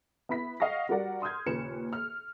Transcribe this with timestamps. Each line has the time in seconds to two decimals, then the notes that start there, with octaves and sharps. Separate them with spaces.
0.29 B3 E4 B5 B6
0.60 D#5 F5 F#5 C#6 A#6
0.89 G3 F#4 A#4 D5 F#5
1.22 C6 D#6 F6 G6 G#6
1.46 D#2 A#2 C#3 B4 C#7 E7
1.93 F6